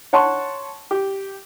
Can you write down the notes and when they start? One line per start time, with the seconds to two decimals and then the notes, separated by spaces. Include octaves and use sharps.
0.13 C#5 F#5 A5 C6 C#6
0.91 G4